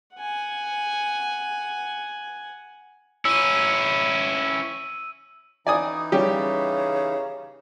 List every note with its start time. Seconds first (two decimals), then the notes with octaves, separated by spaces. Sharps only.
0.15 F#5 G#5
3.25 C#4 E4 E6 D#7
5.67 E3 D#4 D5 G#5 D#6
6.12 C#3 G3 C#4 G4